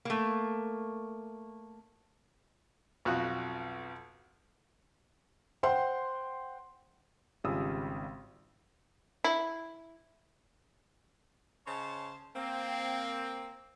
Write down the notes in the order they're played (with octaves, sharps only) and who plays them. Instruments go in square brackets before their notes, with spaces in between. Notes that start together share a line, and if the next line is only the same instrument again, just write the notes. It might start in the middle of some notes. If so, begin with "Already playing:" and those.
[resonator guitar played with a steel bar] A3 A#3
[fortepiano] B1 F2 F4 F#4
[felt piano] C5 F#5 G5 C6
[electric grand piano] G#1 C#3 G3 F4 D#6 E6
[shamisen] E4
[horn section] C#3 C5 C#5 D#5 A5
A#3 C4